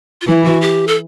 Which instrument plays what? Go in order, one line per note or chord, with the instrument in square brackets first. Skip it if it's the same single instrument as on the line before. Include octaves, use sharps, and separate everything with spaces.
[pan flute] F4
[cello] E3 [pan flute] E4
[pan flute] F#4
G4
A4